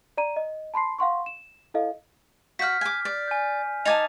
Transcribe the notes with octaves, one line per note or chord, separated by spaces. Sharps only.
D5 A#5 D#7
D#5
A5 B5 C6 C7
F5 F#5 C6 C#6
E7
E4 A4 D#5 F5
F#4 F#5 F6 G6 B6
G#5 D6
D5
G#5 G6
D#4 G#5 A5 D6 A6 F7